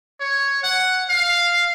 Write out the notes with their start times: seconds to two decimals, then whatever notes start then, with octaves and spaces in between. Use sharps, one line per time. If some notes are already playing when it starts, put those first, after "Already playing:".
0.20 C#5
0.63 F#5
1.09 F5